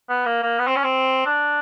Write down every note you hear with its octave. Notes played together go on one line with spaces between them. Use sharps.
B3
A#3
A#3
B3
C4
C#4
C4
D4